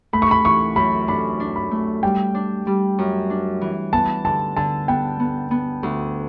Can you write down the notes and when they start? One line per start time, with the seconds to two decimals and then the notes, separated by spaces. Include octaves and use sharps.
0.13 A3 B5
0.22 C#6
0.31 B5
0.45 E3 C#6
0.76 F#2 B5
1.08 D4 B5
1.40 D4
1.56 B5
1.71 A3
2.03 G3 G5
2.35 D4
2.67 G3
2.99 F#2
3.30 D4
3.61 E3
3.93 B3 A5
4.25 D3 A5
4.56 D3 A5
4.88 B3 G5
5.20 B3
5.51 B3
5.83 D2